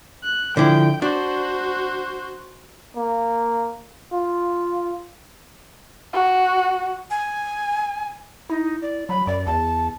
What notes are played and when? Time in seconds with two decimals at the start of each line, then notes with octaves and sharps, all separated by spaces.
0.24 F#6
0.57 D3 F3 E4 G5
1.02 D4 F#4 C5
2.96 A#3
4.12 F4
6.13 F#4
7.10 G#5
8.50 D#4 E4
8.82 D5
9.09 F#3 B5
9.27 F#2 D5
9.46 E2 A5